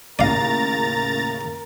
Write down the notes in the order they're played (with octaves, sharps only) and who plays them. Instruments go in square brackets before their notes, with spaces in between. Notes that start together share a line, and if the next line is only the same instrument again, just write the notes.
[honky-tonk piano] D#2 A2 C#3 [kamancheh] A#4 [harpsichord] D5 F5 [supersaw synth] A#5 A6